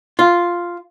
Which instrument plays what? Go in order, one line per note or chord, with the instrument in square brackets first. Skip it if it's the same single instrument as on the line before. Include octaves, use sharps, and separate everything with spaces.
[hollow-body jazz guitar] F4